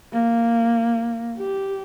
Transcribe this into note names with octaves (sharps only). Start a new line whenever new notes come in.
A#3
G4